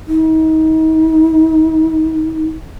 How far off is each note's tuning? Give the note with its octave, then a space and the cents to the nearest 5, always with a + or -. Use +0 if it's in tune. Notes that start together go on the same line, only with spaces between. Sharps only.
D#4 +35